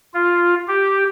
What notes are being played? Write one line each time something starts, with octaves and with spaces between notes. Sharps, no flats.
F4
G4